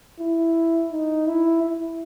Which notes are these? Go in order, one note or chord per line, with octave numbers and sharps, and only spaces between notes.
E4
D#4
E4
E4